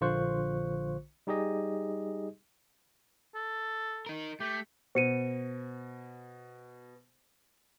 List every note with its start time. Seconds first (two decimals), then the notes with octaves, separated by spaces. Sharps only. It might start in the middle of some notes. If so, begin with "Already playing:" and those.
0.01 A#1 D3 F4 C5 C#6 F#6
1.27 G3 D#4 G4 G#4 D#5
3.35 A4
4.06 D#4 A#4
4.40 A3 G4
4.95 B2 C5 C#7 D#7